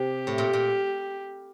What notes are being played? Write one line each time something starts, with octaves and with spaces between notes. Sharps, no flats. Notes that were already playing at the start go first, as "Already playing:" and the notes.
Already playing: C3 G4
A2
A#2
A#2